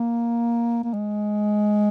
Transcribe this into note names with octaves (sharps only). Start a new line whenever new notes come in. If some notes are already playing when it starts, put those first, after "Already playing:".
Already playing: A#3
A#3
G#3